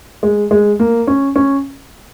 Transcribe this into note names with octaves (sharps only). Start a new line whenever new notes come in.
G#3
G#3
A#3
C#4
C#4